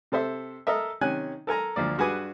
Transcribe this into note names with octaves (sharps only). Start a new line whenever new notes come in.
C3 A4 C5 E5
A4 A#4 D#5 E5
C3 D#3 C#4 G#5 F#6
A4 A#4 G#5 A#5
D2 F3 A#3 D5
G2 F#4 G#4 B4 G#5 D6